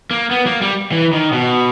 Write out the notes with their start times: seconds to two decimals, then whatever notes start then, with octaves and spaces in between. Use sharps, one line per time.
0.11 A#3
0.31 B3
0.46 A#3
0.62 G3
0.92 E3
1.13 D#3
1.33 B2